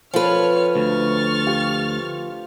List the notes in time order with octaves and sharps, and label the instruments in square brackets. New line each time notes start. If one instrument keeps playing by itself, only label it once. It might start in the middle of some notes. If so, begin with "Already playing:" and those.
[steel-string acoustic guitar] F3 B4 [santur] C4 F4 A4 [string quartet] C#5 F6
[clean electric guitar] D2 [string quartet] C#6 F6 A6
[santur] F4 G4